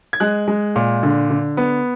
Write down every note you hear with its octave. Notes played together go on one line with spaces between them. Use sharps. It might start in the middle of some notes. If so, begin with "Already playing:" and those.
G#6
G#3 F#6
G#3
A#2
D3
D3
B3